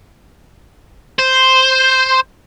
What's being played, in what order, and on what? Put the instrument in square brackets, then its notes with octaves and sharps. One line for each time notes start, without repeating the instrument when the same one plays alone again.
[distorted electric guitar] C5